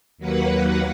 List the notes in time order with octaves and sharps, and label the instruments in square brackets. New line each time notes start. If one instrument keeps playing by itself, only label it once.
[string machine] D#2 F#3 A#3 B4 F#5